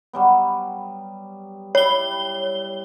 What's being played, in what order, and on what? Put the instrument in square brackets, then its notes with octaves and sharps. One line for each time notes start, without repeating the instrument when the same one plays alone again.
[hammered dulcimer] F#3 G3 B3
[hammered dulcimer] G3 E4 [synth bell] C#5 G7